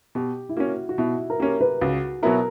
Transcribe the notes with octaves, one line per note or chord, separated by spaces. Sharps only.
B2 G4
E4
A#3 C#4 F#4
F#4
B2 E4
A#4
A#3 C#4 G4
B4
C#2 F#4
B2 F#3 B3 E4 A#4